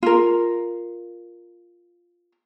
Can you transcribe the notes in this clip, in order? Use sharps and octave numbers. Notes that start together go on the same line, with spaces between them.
F4 A#4